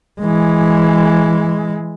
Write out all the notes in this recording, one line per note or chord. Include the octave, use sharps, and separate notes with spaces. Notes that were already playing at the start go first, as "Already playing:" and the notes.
E3 G#3